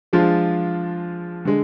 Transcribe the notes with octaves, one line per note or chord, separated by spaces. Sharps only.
F3 G#3 D4 F4
D3 G#3